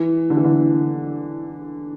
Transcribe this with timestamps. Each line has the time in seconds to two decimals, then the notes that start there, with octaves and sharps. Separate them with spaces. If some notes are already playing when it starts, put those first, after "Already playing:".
Already playing: E3
0.30 D3
0.37 E3
0.44 D3